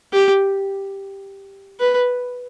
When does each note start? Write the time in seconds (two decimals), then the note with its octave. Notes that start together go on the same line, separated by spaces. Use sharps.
0.13 G4
1.80 B4